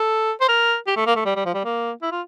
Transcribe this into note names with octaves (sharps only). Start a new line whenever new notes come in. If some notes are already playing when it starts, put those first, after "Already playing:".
Already playing: A4
C5
A#4
G4
A3
A#3
A3
G3
G3
F3
G3
A#3
E4
F4